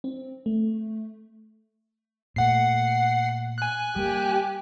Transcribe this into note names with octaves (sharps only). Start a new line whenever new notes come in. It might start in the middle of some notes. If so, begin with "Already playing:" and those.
C4
A3
A#2 A3 F#5 C7
G#5 F#6
G3 A#3 G4